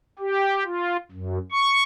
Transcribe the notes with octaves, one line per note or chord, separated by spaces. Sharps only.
G4
F4
F#2
C#6